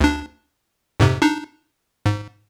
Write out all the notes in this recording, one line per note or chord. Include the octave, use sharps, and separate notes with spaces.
D2 D4
F2 G#2 C3
D4 D#4
G#2